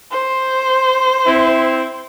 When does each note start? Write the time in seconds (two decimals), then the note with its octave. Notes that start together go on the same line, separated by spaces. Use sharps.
0.12 C5
1.26 C4 E4